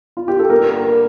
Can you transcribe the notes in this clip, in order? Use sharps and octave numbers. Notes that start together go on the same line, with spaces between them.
F4
G4
A4
G2 D3 G3 A#3 A#4